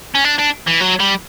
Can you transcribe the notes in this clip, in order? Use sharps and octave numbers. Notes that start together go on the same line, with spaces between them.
C#4
D4
D4
E3
F#3
G3